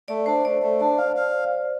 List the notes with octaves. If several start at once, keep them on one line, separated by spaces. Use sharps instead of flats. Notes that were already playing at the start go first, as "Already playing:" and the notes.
A3 D5
D4 C5
A3 D5
A3
D4
F5
F5